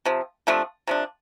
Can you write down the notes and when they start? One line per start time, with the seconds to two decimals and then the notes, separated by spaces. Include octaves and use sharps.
0.05 C3 F3
0.47 C3 F3 A3 D4
0.87 C3 F3 D4